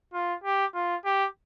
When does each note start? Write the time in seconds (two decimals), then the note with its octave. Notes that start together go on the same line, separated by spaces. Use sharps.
0.13 F4
0.44 G4
0.74 F4
1.05 G4